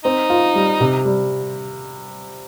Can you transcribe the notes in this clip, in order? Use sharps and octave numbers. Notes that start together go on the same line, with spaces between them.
C4 D#4
F4
G3
C3
G3